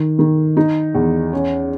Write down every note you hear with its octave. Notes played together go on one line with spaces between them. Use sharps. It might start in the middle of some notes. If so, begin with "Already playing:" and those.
Already playing: D#3
D#3
D#4
E2
C#4